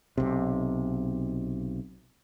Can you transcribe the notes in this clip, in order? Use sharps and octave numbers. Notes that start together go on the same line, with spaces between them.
B1 C3